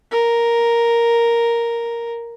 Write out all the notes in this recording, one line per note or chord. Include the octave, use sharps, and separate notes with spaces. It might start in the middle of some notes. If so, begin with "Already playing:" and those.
A#4